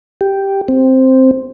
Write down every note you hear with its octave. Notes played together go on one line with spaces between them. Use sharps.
G4
C4